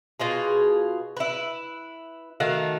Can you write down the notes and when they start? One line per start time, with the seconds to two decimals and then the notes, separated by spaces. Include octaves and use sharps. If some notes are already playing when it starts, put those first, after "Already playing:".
0.20 B2 F4 G#4
1.17 E4 B4
2.40 D#3 A3 F#4 F5